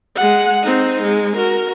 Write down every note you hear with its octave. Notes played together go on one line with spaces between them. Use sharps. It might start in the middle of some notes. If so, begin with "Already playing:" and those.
G#3 F#5
C4 D#4
G#3
F#4 A#4